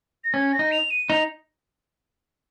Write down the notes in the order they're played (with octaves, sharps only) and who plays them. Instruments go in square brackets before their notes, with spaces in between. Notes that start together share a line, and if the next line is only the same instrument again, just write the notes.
[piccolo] A#6
[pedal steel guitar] C#4 [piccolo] G#6
[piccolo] A#6
[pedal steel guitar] D#4
[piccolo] F7
D#7
[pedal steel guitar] D#4 [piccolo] F7